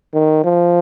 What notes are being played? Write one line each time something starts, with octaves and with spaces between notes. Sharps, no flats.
D#3
F3